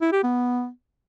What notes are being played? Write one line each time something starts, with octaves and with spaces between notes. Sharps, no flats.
E4
G4
B3